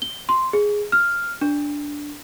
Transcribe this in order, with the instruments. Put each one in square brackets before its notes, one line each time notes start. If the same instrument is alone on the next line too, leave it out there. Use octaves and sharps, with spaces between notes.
[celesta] G7
C6
G#4
F6
D4